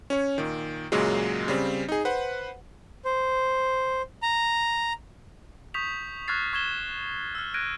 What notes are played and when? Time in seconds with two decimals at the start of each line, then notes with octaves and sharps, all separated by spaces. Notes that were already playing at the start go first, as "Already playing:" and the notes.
0.10 C#4 C#5
0.38 A#2 D#3
0.92 F#2 A#2 C#3 F#3 G#3
1.48 C#3 G3 C4
1.89 D#4 G#4
2.05 B4 C5 F#5
3.05 C5
4.22 A#5
5.74 C#6 D#6 G6 B6 F7
6.28 C#6 F6 F#6 G#6 A6 C7
6.53 C#6 G#6 E7 G7
7.35 E6 F6
7.54 F6 F#6 G#6 A#6 D7 D#7